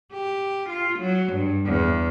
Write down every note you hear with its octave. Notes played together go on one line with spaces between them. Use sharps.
G4
F4
F#3
G2
E2